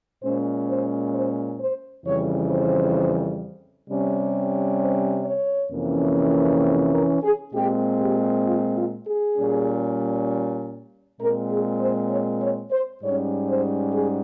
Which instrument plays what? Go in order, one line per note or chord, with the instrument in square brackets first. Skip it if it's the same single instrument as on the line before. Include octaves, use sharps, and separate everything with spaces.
[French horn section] A#2 G#3 C#4 C5
C5
C5
C5
F2 C#3 E3 G3 C#5
C5
C3 G3 C#4
C5
C#5
F2 C3 E3 A#3 C#4
C5
A#4
G#4
A#2 G#3 C4 G4
G4
F4
F4
G#4
A#2 G3 C#4
A#2 G#3 C4 A#4
G#4
C5
C#5
C#5
C5
G#2 G3 C#4 C#5
C5
G#4